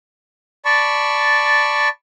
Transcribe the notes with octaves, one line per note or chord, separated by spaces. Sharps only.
D5 A5 B5 C#6